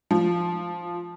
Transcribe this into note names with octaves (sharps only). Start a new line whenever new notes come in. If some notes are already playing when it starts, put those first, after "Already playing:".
F3